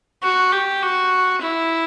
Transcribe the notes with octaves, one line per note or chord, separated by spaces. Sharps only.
F#4
G4
F#4
E4